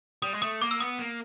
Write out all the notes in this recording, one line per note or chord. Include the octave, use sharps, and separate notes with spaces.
G3 D#6
G#3
A3 D#6
A#3 D6
E6
B3 D#6
A#3